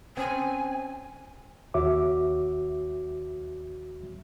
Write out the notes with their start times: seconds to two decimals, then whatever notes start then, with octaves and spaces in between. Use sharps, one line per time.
0.17 C4 C#4 G#5
1.74 D#2 F#4 C#5 E5 D6